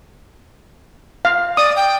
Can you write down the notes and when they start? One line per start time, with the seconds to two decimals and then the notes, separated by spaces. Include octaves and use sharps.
1.25 F5
1.57 D5 D#6
1.76 G5